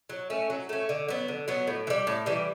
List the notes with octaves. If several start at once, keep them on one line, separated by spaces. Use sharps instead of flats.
F#3
A3 C#4
F#3
A3 C#4
D3
F#3 B3
D3
F#3 B3
A2
E3
G3
A2
E3 G3